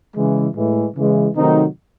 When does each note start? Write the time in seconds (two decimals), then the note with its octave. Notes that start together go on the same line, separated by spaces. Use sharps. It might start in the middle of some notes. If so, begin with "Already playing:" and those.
0.16 C#3 E3 G#3
0.55 A2 E3 G#3
0.95 C#3 E3 G#3
1.34 C3 D#3 F#3 A3 C4 D#4